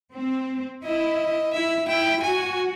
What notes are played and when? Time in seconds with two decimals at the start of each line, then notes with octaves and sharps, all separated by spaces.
0.15 C4
0.84 E4 D#5
1.53 E4 E5
1.88 E4 G5
2.22 F#4 G#5